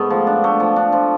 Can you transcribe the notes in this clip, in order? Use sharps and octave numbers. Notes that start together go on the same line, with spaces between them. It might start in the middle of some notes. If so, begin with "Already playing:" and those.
Already playing: G#2 A3 B3
F3
D4
A3
F3
D4
F3